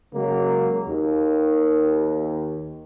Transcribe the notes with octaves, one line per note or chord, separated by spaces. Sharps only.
C#3 F#3 G#3 A#3
D#2